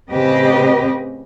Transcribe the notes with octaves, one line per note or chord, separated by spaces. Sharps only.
A2 C#3 C4 G4 B4 D#5